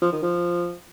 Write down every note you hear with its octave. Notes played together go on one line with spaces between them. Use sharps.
F3
D#3
F3